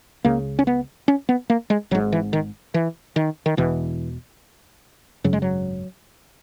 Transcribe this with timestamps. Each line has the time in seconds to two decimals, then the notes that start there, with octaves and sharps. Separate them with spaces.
0.25 C#2 C#3 A#3
0.59 C#4
0.67 B3
1.08 C#4
1.29 B3
1.50 A#3
1.70 G#3
1.91 G#1 F#3
1.95 G#2
2.12 E3
2.33 D#3
2.74 E3
3.16 D#3
3.46 D#3
3.57 E1 E2 B2 E3
5.24 G#1 F#2 C#3 F#3
5.33 G#3
5.42 F#3